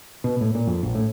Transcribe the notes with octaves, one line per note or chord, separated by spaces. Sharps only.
B2
A2
A#2
F2
A#1
A2